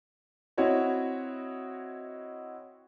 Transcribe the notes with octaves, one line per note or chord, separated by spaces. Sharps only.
C4 E4 F#4 C#5 D#5